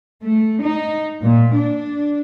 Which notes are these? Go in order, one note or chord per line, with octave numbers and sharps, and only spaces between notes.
A3
D#4
A#2
D4